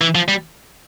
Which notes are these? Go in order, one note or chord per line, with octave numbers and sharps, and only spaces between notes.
E3
F3
G3